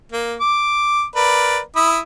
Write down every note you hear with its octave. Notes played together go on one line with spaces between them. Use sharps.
A#3
D6
A#4 B4 D5
E4 B5 D#6